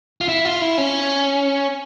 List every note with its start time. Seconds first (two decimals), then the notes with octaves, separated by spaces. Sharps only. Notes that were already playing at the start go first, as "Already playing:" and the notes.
0.21 F4
0.28 E4
0.45 F4
0.61 E4
0.78 C#4